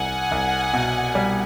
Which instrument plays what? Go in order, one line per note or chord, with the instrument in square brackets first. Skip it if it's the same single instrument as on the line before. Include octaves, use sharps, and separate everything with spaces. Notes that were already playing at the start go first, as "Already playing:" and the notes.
Already playing: [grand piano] C2 [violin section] F#5 G#5
[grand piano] C2
B2
G3